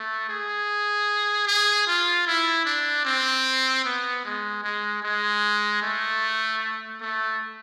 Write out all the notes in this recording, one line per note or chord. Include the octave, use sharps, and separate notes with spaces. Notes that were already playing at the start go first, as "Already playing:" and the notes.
Already playing: A3
G#4
G#4
F4
E4
D4
C4
B3
G#3
G#3
G#3
A3
A3